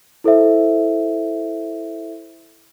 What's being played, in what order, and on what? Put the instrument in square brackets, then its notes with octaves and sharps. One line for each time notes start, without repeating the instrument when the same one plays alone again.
[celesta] E4 A4 C5 E5